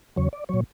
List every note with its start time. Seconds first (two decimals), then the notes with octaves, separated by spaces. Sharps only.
0.16 E2 C#3 F#3 C#5
0.33 D5
0.49 A#2 F#3 C#5